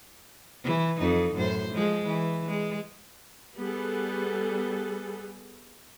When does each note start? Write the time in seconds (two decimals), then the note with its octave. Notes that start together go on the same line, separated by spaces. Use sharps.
0.64 E3
0.99 F2 D#4
1.35 F#2 A2 C5
1.72 F3 G#3
2.06 E3
2.47 G#3
3.58 G3 B3 G#4 A4